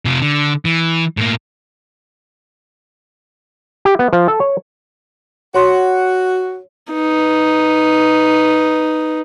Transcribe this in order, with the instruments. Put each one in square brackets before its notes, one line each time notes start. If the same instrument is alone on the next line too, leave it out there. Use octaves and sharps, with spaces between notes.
[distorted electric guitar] C3 F4
D3
E3
A2 A#3
[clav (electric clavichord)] G4
B3
F3
A4
C#5
[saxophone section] F#4 [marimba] C#5 C6
[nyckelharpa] D#4 B4